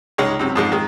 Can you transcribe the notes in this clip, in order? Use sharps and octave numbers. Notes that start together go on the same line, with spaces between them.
C#2 G#3 D#4 C#5
F#2 C3
F2 G#2 G#3
D#3 G#3